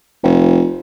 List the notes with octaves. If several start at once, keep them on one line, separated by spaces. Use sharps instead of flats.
F1